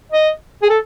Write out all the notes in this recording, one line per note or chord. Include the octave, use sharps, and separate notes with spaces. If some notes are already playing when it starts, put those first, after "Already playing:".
D#5
G#4
A4